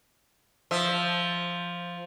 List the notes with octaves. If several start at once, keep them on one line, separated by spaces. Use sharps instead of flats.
F3 E5